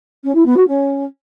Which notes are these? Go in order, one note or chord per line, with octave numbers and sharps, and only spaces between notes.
C#4
E4
B3
F#4
C#4